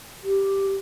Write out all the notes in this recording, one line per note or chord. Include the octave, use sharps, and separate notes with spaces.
G4